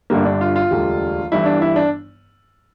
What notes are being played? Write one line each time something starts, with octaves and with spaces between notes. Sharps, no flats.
G1 G2 D3 G3 A#3
D4
F4
F4
E1 D2 D3 G3
G1 G2 E3 E4
D4
E4
D4